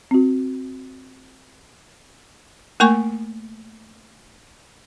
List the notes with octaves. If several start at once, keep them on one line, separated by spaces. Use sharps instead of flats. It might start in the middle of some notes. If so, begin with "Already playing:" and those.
C4 F#4
A3 A#3 A#4 G#5 C#6